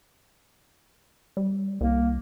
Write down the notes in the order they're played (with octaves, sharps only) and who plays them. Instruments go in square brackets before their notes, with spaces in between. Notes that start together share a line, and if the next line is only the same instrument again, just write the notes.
[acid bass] G3
[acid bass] C2 [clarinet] A#3